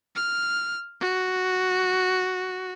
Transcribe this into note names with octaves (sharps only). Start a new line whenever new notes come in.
F6
F#4